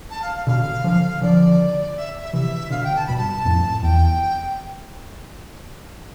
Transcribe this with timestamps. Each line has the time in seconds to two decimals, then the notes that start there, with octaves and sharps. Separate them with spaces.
0.10 A5
0.22 F5
0.35 F5
0.47 B2 D3 F5
0.84 D3 F3
1.22 D3 F3 D5
1.96 E5
2.21 E5
2.33 C3 E3 E5
2.70 B2 D3 F5
2.83 G5
2.96 A5
3.06 G2 B2 B5
3.16 A5
3.45 F2 A2
3.83 E2 G5